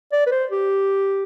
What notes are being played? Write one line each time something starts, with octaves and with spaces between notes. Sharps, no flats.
D5
B4
C5
G4